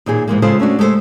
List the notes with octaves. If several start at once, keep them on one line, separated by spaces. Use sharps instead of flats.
D#2 A#2 D#4 G#4
G#2 E3 G#3 A#3
C#3 G#3 F4 A4 C5
A3 C#4 D4 F#4
G#3 A3 B3 A4 C5